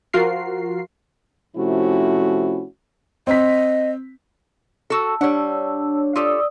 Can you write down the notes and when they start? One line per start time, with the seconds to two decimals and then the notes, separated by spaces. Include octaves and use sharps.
0.13 F3 F4 F#4 A#4 C7
1.57 C3 F3 A3 C#4 E4 F#4
3.27 C4 D#5 B6
4.90 F#4 A4 A5 E6
5.21 G3 D4 C#5 F#5
6.16 F4 G4 A4 D5 D#6 E6